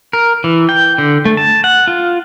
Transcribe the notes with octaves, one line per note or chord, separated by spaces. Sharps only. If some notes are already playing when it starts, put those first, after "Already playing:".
A#4
E3
G5
D3
A3
A5
F#5
F4